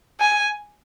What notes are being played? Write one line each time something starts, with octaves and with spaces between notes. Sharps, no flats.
G#5